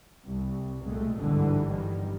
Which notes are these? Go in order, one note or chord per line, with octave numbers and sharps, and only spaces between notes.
C2
C2 A#2 G#3 A3
G1 G#2 D3 E3 G3
G1 D#3 G3